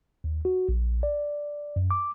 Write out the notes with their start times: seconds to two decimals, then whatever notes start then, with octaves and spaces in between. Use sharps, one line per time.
0.24 D#2
0.45 F#4
0.69 A#1
1.03 D5
1.76 F#2
1.91 D6